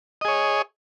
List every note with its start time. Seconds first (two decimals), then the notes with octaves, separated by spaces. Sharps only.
0.21 D#5
0.25 G#4
0.28 C#5